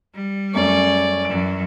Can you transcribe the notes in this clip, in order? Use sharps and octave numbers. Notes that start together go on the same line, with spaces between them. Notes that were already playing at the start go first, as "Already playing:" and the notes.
G3
F#2 A3 C#4 D5
F#2 E3 D7